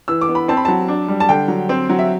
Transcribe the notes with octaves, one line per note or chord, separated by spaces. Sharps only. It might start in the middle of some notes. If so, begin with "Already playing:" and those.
E3 E6
D6
B3
B5
C4 A5
B5
F#3 A5
D4
G3
A5
D3 G5
F#3
C4
F#3
E5